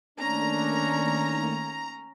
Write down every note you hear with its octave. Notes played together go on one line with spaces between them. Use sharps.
D#3 A3 A#3 C#4 D4 A#5